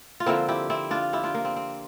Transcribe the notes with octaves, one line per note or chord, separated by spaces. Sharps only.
F4
D3 F3 A#3 C4 E4
E4 G4
C4 E4
D4 F4
E4 G4
D4 F4
A#3
C4
C4